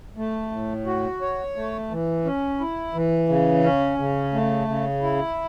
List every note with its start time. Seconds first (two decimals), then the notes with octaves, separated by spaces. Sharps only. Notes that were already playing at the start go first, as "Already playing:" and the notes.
0.17 A3
0.51 A2
0.86 F#4
1.21 C#5
1.56 A3
1.91 E3
2.25 C#4
2.60 E4
2.94 E3
3.29 C#3
3.64 C#4
3.98 C#3
4.33 A3
4.68 C#3
5.03 E4